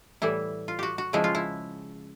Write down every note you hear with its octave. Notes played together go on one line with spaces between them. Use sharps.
A2 E3 G3 E4
F4
F#4 G4
F#4
C#3 F3 G#3 E4
F4
E4